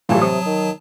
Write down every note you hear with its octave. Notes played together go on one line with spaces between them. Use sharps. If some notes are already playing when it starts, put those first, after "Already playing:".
A2 E3 F#3 G3 F4 A5
C3 D#6
D#3